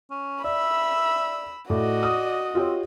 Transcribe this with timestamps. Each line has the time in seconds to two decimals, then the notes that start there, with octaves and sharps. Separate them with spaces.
0.11 C#4
0.44 D5 E5 B5 E6
1.70 A2 F#4 D5 D#5
2.03 D#6
2.55 C4 F4 G4 C#5